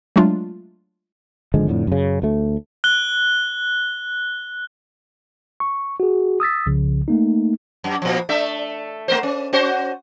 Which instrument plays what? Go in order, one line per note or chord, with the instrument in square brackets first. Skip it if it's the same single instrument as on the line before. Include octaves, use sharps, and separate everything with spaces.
[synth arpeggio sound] F#3 G#3 A3 D4 F4
[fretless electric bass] G#1 D3 F3 G#3
F2 A2 D3
F#2 C#3
D2 A3
[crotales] F#6 G7
[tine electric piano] C#6
F#4 G#4
D#6 E6 A6 B6
C2 C#3 F3
A3 A#3 D#4
[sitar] F#2
A#2 F3
A3 D4 E5
A3 A#4 C5
C#4
C#4 F#4 C5